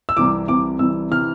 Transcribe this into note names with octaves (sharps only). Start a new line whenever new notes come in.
E6
C2 C3 E3 D6
C2 C3 E3 D6
C2 C3 E3 E6
C3 E3 F6